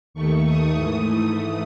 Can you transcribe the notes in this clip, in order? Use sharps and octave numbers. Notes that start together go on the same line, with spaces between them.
D#2 D#3 A3 C#6
D#6
G#2 E3 A3